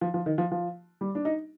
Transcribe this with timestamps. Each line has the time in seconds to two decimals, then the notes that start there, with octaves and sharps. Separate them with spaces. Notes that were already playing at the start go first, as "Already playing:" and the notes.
0.01 F3
0.14 F3
0.26 D#3
0.38 F3
0.52 F3
1.01 G3
1.15 D4
1.25 D#4